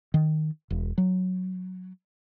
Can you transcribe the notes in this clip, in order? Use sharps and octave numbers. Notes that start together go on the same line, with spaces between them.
D#3
E1
F#3